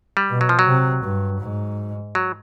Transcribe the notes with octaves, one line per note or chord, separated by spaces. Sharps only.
G3
B2
F#3
F3
F#3
C3
G2
G#2
F#3